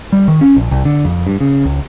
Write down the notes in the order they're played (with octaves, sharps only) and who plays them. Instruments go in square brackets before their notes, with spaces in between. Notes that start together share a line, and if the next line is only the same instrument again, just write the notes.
[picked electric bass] G3
D#3
C#4
A#1
C2
D3
F2
G2
C#3
C#2